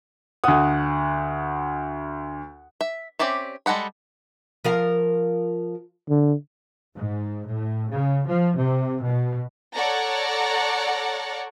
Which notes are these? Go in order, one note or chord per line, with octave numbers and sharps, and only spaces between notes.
D2 F#5 D#6
E5
C4 C#4 G4 D5 E5
G3 G#3 A4 F#5 B5
F3 A#4 F5
D3
G#2
A2
C#3
F3
C3
B2
A4 C#5 D5 F#5 A#5